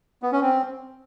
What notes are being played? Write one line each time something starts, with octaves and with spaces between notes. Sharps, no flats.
B3
C#4
C4